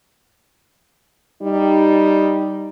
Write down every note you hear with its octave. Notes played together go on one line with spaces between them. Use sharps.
G3 D#4